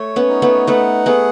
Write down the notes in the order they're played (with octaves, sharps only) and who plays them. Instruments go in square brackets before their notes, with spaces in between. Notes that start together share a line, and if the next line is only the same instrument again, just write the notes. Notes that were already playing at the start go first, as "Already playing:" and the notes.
Already playing: [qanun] A3 [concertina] C#5
[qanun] B3 C#4
[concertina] D#4
[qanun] A3 B3
[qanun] A3 B3 [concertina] F#5
[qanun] A3 B3 [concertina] G#4